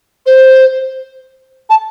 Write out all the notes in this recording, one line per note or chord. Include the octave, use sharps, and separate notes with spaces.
C5
A5